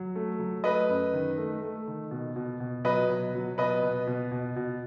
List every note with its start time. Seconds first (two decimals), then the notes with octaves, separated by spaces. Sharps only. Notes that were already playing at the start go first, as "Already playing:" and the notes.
Already playing: F#3
0.15 A3
0.40 F#3
0.64 A3 B4 D#5
0.89 F#2
1.13 D#3
1.38 A3
1.62 A3
1.87 D#3
2.11 B2
2.36 B2
2.60 B2
2.85 F#3 B4 D#5
3.09 B2
3.34 F#3
3.58 B2 B4 D#5
3.82 B2
4.07 B2
4.32 B2
4.56 B2